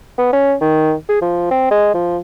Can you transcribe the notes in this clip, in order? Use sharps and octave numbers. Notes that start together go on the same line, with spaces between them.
B3
C#4
D#3
G#4
F3
C4
G#3
F3